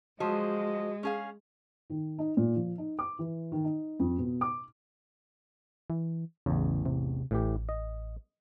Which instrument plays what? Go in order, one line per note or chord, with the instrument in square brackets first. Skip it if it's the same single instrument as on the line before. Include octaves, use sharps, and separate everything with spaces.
[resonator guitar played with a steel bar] F3 F#3 C5 [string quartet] G#3 [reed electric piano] F#4 [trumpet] D#5
[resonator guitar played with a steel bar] C#4 G#4 F5
[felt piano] D#3
D#4
A#2
F3
D#4
D6
E3
D#3
D#4
F2
B2
D6
[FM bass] E3
[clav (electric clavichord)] A1 E2 [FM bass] C#3
[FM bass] C3
[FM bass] A1 [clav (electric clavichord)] A2 E3 G4
[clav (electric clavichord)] D#5